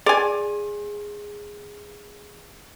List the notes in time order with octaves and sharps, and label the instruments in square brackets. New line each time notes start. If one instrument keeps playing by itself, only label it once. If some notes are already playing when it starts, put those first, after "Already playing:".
[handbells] G#4 [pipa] D5 G#5